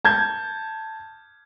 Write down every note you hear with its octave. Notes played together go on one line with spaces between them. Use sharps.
A5 G6 G#6